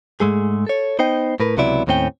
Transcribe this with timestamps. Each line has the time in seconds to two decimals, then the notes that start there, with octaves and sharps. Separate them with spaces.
0.20 G#2 G#3 A3 G#4
0.67 A4 C#5
0.99 B3 D#4 C5 D#5 G5
1.40 A2 A#4 B4
1.57 C#2 C3 F#3 B3 E4 D5
1.87 D#2 A2 C4 C#4 G5